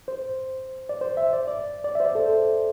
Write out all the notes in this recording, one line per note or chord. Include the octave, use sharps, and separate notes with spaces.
C5
D5
C5
E5
D5
D5
D5
C5 E5
D5
A4
C5